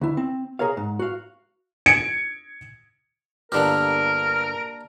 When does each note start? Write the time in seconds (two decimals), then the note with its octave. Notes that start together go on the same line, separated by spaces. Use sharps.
0.01 D2 E4
0.17 C4
0.59 G#4 A#4 C#5 F5
0.77 G#2
0.99 F#4 F5
1.86 G#6 C#7 D7
3.52 G1 D3 A#3 D4 G4 A#4 F6